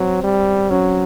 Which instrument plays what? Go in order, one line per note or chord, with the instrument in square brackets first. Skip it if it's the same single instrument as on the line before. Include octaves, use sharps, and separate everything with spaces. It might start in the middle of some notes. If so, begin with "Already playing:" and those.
Already playing: [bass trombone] F#3 [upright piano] C4
[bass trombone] G3
[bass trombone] F#3 [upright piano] C#4